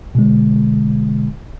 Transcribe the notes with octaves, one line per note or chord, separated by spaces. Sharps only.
B2 D3 G#3